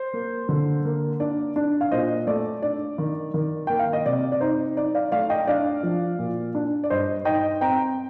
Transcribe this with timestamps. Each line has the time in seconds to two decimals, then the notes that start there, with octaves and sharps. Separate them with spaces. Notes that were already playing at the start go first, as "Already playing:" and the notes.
Already playing: C5
0.13 A#3
0.49 D3
0.85 A#3
1.20 D4 D5
1.56 D4
1.81 F5
1.92 A#2 C5 D#5
2.27 A3 D5
2.62 D4 D5
2.98 D#3
3.34 D#3
3.67 A#3 G5
3.79 F5
3.93 D#5
4.06 C3 D5
4.32 D5
4.40 D#4 C5
4.77 D#4 D5
4.95 D5 F5
5.12 A3 D5 F5
5.30 D#5 G5
5.47 D4 D5 F5
5.83 F3
6.19 A#2
6.55 D4
6.84 D5
6.90 G2 C5 D#5
7.25 D#4 D#5 G5
7.61 C4 G5 A#5